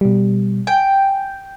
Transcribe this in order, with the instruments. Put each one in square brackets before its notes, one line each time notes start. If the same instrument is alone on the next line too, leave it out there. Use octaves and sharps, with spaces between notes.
[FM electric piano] B2 G3
[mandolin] G5 [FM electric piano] G#5